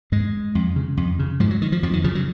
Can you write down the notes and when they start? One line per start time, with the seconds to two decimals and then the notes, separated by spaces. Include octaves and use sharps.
0.12 G#2 G#3
0.55 F2
0.76 C#3
0.97 F2
1.19 C#3
1.40 G#2 F3
1.51 F#3
1.62 D#3
1.72 F3
1.83 F2 F3
1.93 D#3
2.04 C#3 F3
2.15 F#3